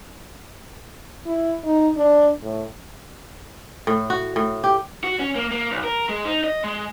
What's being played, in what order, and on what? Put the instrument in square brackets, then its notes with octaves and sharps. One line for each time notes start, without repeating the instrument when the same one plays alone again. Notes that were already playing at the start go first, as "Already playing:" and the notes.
[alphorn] E4
D#4
D4
A2
[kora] A2
F#4
A2
G4
[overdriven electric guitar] F#4
C#4
A#3
A#3
B1
A#4
G#3
D#4
D#5
G#3